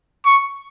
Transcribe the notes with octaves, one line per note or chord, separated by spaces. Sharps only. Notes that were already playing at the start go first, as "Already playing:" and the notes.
C#6